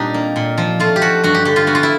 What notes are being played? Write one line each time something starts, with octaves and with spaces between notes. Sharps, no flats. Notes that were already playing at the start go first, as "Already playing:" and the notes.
Already playing: A#2 G3 C4 D4 D#4 G4
A#3
A#2
F3
A3 F4
G4
F3 F#4
G2 F#4
G4
D3 G4
F4
B3 F#4
F4
E4